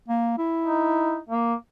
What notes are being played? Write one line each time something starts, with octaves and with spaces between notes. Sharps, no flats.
A#3
E4
D#4
A#3